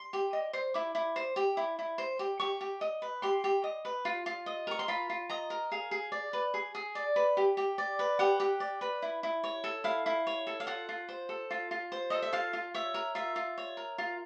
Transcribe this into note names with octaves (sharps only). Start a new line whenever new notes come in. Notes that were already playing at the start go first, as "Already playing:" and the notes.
Already playing: C6
G4
D#5
C5
E4 D6
E4
C5
G4
E4
E4
C5
G4
G4 C#6
G4
D#5
B4
G4 C6
G4
D#5
B4
F4
F4
D#5
A#4 C#6
C6
F4 B5
F4
D#5 A#5
A#4
G#4 F5
G#4
D5
B4
G#4
G#4
D5
B4
G4
G4
D5
B4
G4 F#5
G4
D5
B4
E4
E4
C#5
A4
E4 F5
E4
C#5
A4
F5
F4 F#5
F4
C5
A4
F4
F4
C5
A4 D#5
E5
F4 F5
F4
C#5 E5
A#4
F4 E5
F4
C#5
A#4
F4